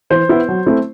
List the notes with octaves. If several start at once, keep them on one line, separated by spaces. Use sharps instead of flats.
E3 C5
B3 E4
F#3
A3 C4 E4